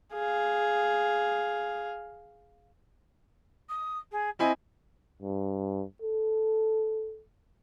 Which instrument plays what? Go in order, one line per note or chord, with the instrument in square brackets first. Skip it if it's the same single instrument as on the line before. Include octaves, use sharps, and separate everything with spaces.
[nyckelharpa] G#4 F5
[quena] D#6
G#4
[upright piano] C4 E4 G#5 [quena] D#5
[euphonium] G2
A4